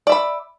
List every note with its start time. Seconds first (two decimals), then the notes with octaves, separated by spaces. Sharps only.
0.07 D5
0.09 E5
0.12 B5